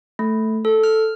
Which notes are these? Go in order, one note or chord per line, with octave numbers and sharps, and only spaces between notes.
A3
A4
F6